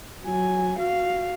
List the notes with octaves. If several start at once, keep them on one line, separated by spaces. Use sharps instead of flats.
F#3 G#5
F#4 F5